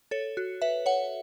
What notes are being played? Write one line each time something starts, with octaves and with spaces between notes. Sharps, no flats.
A4 C#5
F#4
B4 E5
C#5 F#5